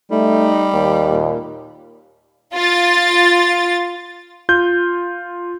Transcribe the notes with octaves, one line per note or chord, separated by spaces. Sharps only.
G3 A3 D#4
D#2
A#2
F4 A6
F4 G6